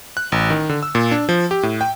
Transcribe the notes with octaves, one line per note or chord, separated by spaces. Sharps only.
F#6
A1
D#3
D3
E6
A#2
D4
F3
G4
A2
G5